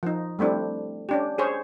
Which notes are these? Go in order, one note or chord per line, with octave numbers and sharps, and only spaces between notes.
F3 D#4
G3 A3 C4 D4 E4
C#4 D4 G4
G#4 C5 C#5